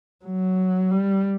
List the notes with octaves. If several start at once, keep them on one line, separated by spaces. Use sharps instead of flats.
F#3
G3